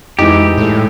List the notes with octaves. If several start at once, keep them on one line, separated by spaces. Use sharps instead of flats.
F2 E3 G#3 D#4 G4
A2 G#3 A4